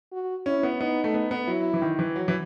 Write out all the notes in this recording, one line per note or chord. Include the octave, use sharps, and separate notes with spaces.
F#4
C#4 E4
B3
B3 D#4
A3
B3
B3
F#3 E4
E3
D#3
E3
F#3
E3